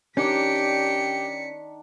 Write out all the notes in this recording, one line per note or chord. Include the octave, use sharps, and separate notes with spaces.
D#3 C#4 D4 G4 D5 B6 C#7